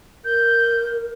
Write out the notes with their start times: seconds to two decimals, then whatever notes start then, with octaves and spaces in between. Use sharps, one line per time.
0.25 A#4 G6